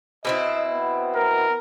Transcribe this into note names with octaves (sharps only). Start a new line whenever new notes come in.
B2 C4 E4 D#5
B3
A#4